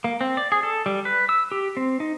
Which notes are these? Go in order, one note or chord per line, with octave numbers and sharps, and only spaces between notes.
A#3
C4
D5
G#4
A4
G3
B4
E6
G4
C4
D#4